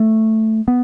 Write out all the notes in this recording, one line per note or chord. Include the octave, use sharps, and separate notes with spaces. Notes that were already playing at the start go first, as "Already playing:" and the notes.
Already playing: A3
B3